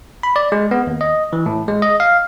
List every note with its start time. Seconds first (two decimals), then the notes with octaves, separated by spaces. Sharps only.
0.23 B5
0.36 D5
0.52 G#3
0.71 B3
0.87 D#2
1.01 D#5
1.33 E3
1.46 A2
1.68 G#3
1.82 D#5
2.00 F5